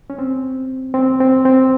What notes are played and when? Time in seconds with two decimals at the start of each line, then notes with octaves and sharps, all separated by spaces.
0.10 C#4
0.19 C4
0.94 C4
1.20 C4
1.45 C4